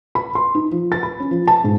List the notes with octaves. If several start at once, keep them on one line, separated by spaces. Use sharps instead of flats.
B5
C6
D#4
F3
A6
B5
C#4
F3
A5
G#2